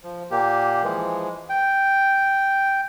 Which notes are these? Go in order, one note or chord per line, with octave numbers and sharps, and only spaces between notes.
F3
A#2 A#3 G4
E3 F3 G#3
G5